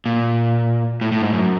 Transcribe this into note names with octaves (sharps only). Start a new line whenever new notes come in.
A#2
A2
A2
G#2
F#2